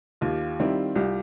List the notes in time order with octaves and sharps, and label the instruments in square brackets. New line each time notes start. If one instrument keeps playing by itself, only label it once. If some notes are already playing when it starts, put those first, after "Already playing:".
[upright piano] D#2 [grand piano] F4 G4
[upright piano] D#3 G3 C4 E4
[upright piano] C2 [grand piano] F4 G4